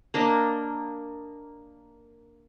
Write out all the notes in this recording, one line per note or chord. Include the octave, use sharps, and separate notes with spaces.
A#3 D4 D#5